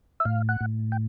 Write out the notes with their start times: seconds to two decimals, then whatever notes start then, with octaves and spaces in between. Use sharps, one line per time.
0.20 E5
0.25 A2 F5
0.49 F#5
0.61 A2
0.92 G5